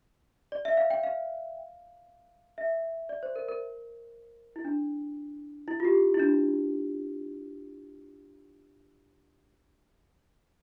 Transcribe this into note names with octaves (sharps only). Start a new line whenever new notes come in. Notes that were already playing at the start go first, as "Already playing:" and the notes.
D5
E5
F5
G5
F5
E5
D5
C5
A#4
A#4
E4
D4
E4
F4
G4
E4
D4